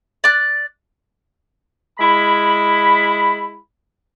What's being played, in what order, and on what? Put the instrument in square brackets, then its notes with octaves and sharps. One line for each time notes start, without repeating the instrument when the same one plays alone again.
[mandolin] D5 F#6
[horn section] G#3 E4 B5